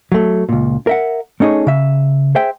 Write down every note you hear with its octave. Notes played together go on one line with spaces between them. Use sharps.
F#3 A3
C#2 A#2
A#4 E5 F#5
A3 C#4 D#4 G#4 C#5
C#3 E5
G#4 C5 E5 G5